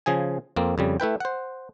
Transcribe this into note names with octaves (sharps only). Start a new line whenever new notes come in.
C#3 F3 G#4 G#5
F2 A#3 C4
F2 C#3 G3
A3 E4 B4 G5
C5 F#5